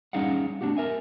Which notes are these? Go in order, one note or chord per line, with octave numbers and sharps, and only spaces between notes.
G3 C#4 D#4 G#4 F5 F#5
A3 C4 D4 D#4 F#4 G4
A#4 E5 G#5